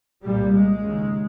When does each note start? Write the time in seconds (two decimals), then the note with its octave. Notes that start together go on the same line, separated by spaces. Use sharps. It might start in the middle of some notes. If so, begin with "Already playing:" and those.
0.24 C2 A#2 G3
0.54 G#3
0.83 D#2 C#3